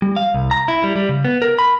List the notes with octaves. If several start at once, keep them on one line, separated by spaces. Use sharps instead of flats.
G3
F5
C2
A#5
E4
G3
G3
C#3
B3
A#4
B5